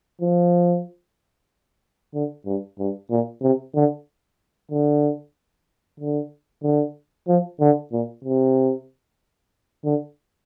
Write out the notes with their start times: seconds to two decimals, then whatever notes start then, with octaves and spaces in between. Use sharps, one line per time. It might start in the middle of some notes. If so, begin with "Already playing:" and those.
0.21 F3
2.14 D3
2.46 G2
2.79 G2
3.10 A#2
3.42 C3
3.75 D3
4.71 D3
6.00 D3
6.63 D3
7.28 F3
7.60 D3
7.92 A#2
8.24 C3
9.85 D3